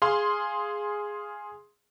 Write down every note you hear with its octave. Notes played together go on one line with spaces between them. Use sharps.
G#4 F5 C6